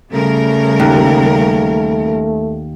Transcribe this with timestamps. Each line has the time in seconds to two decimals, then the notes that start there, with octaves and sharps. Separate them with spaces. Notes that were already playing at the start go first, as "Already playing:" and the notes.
0.13 C#3 G3 A3 A#4
0.80 D#2